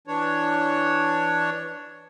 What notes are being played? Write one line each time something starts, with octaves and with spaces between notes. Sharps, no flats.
E3 D4 C#5